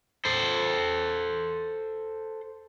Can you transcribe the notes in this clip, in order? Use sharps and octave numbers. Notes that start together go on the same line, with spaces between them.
A4 C5